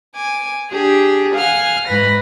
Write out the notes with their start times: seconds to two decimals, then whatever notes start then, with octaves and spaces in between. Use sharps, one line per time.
0.16 G#5 D6
0.71 D4 G4 G#4
1.35 F5 F#5 G#5 F6
1.87 G#2 E3 B4 B5 A#6